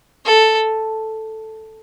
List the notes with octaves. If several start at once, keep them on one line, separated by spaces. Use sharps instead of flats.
A4